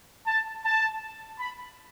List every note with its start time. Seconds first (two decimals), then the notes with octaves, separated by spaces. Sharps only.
0.27 A5
0.65 A5
1.39 B5